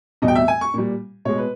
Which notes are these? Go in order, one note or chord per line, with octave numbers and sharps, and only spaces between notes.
E2 B2 G3 D#5
G5
E5
G#5
C#6
A#2 G3
B2 G#3 C#5
B4